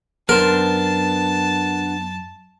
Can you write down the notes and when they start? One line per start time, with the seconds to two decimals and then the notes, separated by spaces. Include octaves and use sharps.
0.29 F#2 B3 D4 A#4 C5 A5